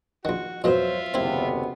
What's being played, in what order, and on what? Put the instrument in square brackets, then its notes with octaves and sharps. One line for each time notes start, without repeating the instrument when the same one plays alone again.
[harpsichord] A#1 D#3 [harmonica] F#4
[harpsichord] F2 B2 B3 [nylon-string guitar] F#3 C5 [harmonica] F4 E5
[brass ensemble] F#1 C3 B3 [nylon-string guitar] D#2 [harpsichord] C4 E4